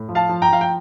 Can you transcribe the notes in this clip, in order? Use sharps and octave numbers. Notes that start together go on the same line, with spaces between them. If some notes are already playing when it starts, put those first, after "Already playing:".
Already playing: A2
F3
F5 A5
F3
G5 A#5
F3 F5
G5